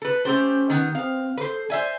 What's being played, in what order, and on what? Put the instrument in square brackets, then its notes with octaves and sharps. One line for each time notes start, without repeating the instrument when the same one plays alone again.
[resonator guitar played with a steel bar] A4 B4
[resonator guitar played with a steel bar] A3 G4 C5 [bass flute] C#4
[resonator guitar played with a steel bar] D#3 B3
[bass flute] C4 [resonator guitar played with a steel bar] F5
[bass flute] A4 [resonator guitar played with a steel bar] B4 C5
[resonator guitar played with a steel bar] C5 E5 G#5 [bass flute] D5